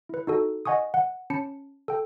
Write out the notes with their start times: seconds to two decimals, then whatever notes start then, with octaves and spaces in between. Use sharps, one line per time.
0.09 E4 B4
0.27 D#4 F#4 A4
0.65 D#5 F#5 G#5 C#6 D#6
0.94 F#5
1.30 C#4 A5 B5 C#7
1.88 A4 G5